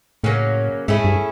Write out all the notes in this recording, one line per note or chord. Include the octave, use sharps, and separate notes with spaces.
A2 C#3 F#3 A#3 C#4
G#2 A3 C#4 E4 G#4
G2